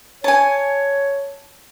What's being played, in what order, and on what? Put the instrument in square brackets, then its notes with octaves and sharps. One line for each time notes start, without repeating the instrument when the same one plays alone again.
[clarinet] C#5 [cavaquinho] G#5 A5